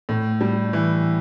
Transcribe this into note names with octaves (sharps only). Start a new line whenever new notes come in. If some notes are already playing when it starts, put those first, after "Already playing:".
A2
G3
E3